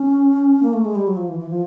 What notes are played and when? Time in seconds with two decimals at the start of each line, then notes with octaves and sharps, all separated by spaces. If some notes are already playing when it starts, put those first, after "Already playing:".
Already playing: C#4
0.63 A#3
0.73 A3
0.85 G#3
0.95 G3
1.07 F#3
1.17 F3
1.28 E3
1.39 E3
1.50 F3